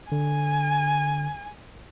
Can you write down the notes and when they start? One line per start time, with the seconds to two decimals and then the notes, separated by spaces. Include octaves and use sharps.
0.12 D3 G#5